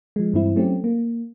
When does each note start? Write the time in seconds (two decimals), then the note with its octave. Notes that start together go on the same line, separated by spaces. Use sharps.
0.16 F3 G#3
0.34 G2 E3 C4 E4
0.56 F#3 A3 C4 C#4 G4
0.84 A#3